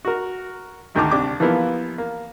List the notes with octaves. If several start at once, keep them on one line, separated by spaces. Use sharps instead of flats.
F#4 A#4
G#1 D2 D#3 D#4 A5 D6
C2 D4 G4 D6
E3 F3 G3 A#3 B3 E4
A#3